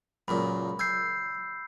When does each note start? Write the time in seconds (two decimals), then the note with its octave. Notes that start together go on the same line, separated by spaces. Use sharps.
0.28 C#2 F#2 A#2 B5
0.79 G#5 E6 G6 C7